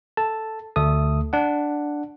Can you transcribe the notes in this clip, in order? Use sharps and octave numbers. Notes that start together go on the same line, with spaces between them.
A4 A5
D2 A3 A4 D#6
D4 F#5